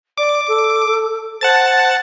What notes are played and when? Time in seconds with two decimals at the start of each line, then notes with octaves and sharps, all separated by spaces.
0.18 D5 D6
0.47 A4
1.41 C5 F#5 A5 A6